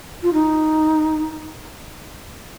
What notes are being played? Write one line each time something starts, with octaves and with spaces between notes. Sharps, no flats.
F4
D#4